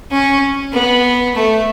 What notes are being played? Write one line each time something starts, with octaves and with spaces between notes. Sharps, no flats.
C#4
B3
A3